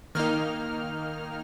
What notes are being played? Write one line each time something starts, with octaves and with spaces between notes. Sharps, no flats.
D#3 A#3 D#4 F6